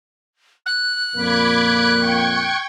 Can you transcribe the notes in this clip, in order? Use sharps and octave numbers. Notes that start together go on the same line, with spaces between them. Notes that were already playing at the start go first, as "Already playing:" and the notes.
F#6
F2 A#2 A#3 B5 D6 G#6
G5 C#6 G#6